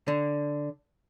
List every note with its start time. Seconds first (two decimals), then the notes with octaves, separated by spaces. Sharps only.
0.08 D3